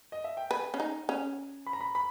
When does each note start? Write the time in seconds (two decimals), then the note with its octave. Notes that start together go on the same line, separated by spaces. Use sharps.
0.12 D#5
0.24 E5
0.37 G5
0.51 B4 G#5
0.74 C#4
0.80 D#4
1.09 C#4
1.67 B5
1.73 A#5
1.81 B5
1.95 B5